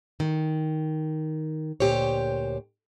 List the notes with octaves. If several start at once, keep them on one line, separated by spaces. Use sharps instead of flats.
D#3
D2 A#2 G4 C5 C#5